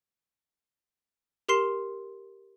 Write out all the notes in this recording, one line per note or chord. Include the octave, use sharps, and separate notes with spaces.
G4 A#4 C6 C7 E7